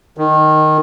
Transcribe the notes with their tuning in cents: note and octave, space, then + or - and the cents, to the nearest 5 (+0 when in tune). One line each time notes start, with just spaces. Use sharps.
D#3 -10